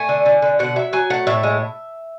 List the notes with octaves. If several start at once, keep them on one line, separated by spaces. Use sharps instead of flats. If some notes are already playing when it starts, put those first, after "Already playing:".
Already playing: A3 G#5
D3
D3
D3
B2 F#5
F#3 E5
F#3 G#5
A3 F#5
A2 E5
G#3